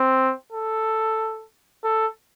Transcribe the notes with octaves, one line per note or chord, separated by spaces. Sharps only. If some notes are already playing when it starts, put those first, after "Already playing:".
Already playing: C4
A4
A4